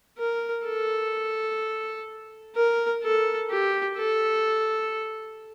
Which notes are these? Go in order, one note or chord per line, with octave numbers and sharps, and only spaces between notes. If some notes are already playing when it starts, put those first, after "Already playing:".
A#4
A4
A#4
A4
G4
A4